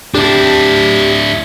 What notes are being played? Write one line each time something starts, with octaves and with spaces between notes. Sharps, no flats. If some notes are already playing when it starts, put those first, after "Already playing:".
D4 E4 G4 A5